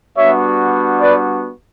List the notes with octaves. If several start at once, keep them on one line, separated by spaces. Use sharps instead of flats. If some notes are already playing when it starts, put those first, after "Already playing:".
G3 B3 D4 F#4 C#5 E5
B4 D5